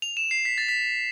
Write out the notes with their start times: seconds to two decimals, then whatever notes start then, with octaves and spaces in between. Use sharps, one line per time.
0.02 F7
0.17 E7
0.31 C7
0.45 B6
0.58 A6
0.69 B6